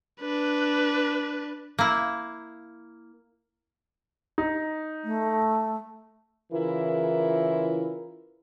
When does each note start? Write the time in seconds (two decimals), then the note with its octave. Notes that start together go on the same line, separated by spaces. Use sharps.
0.21 D4 B4
1.79 A#3 E4
4.38 D#4
5.04 A3
6.52 C#3 E3 E4 F4 A#4